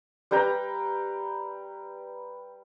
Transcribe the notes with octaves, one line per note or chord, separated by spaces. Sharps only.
G3 B4 G5 A#5